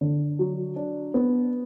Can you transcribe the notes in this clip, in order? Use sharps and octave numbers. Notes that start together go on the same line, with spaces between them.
D3
F#3
D4
B3